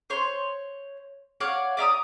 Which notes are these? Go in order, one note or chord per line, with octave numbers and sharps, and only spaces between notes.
C5 C#5 C6
C#5 D5 F5 F#5
D5 E5 A#5 D#6